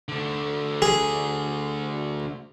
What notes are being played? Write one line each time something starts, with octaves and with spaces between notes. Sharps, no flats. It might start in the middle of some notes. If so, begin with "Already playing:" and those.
D3 A3
G#4